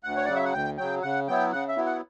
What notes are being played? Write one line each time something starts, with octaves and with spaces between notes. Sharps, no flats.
D2 F#5
C#5
C#3 F#3 D5
E5
F#5
D2 G5
C#3 F#3 G5
C#3 F#5
F#3 B3 E4 G5
C#3 F#5
E5
F#3 B3 E4
F#5